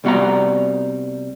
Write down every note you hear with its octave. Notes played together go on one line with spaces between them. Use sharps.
C2 G3 B3 F#4 D5 A#5